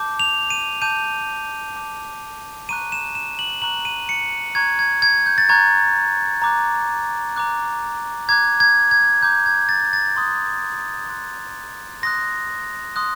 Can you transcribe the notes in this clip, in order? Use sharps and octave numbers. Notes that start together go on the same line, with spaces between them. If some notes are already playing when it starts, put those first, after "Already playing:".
Already playing: A5 D6 G6
F7
D#7
A5 D6 G6 D#7
A5 D6 G6
A#5 C#6 F#6 D#7
E7
E7
F#7
A#5 C#6 F#6 F#7
D#7
C#7
A#5 C#6 F#6 G#6
G#6
G#6
G6
A6
A#5 C#6 F#6 G#6
A#5 D6 F#6
A#5 D6 F#6
A#5 D6 F#6 G#6
G#6
G#6
A#5 D6 F#6 G6
G#6
A6
A6
C6 D#6 F#6
C6 D#6 F#6
C6 D#6 F#6 A#6
C6 D#6 F#6